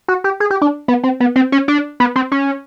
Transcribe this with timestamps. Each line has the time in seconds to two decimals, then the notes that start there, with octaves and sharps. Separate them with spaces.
0.08 F#4
0.24 G4
0.40 G#4
0.51 G4
0.62 D4
0.88 B3
1.04 C4
1.20 B3
1.36 C4
1.52 C#4
1.68 D4
2.00 B3
2.16 C4
2.32 C#4